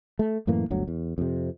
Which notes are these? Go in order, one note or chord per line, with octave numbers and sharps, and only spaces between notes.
A3
F#2 A2 E3 A#3
G1 D2 F#3
E2
F2 C3